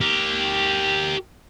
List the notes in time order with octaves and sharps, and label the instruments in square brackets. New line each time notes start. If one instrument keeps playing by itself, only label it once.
[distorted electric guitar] G4 A#4